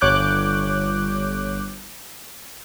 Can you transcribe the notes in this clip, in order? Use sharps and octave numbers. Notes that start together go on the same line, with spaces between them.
G1 C#5 D6 F#6 G6